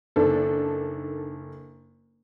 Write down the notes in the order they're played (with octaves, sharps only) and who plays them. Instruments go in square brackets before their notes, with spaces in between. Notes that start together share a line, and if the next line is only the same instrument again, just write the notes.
[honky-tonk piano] F#1 D#3 D4 A4